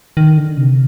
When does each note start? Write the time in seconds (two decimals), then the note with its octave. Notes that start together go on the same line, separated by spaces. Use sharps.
0.17 D#3
0.37 D3
0.57 C3